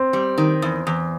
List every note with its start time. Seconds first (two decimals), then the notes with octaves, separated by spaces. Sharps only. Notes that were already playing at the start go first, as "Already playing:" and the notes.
Already playing: C4
0.13 G3
0.38 D#3
0.62 E2
0.87 E2